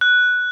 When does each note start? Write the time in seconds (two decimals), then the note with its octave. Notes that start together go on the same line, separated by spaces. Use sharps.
0.01 F#6